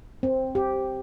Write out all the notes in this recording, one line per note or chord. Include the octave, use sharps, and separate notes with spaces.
C4
G4